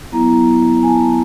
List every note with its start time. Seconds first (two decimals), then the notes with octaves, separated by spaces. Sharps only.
0.12 F#3 B3 E4 A#5
0.83 G#5
0.88 A5